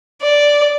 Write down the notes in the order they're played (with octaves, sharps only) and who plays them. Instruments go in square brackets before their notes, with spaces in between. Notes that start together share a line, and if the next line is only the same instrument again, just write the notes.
[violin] D5